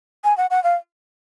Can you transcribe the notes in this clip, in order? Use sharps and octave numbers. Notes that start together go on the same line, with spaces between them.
G#5
F#5
F#5
F5